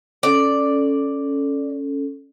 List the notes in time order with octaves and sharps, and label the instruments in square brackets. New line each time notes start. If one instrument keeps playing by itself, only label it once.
[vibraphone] C#4 A4 [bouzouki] D5